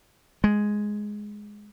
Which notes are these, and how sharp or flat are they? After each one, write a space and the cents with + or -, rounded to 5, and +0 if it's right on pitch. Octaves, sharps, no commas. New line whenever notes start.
G#3 +5